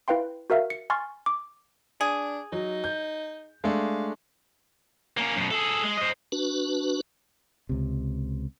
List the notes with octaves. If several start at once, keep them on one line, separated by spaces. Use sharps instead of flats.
E4 B4 F5 G5 C6
F#4 A#4 E5 F5
C#7
G#5 C6 C#6 F6 A6
D6
D4 G#4
F#3 D#4
G6
G#3 A3 D4 F5
A#3 C#4
F#2 B2
G#4 A4
G#3
C5 D#5
D4 F#4 B4
C#2 C3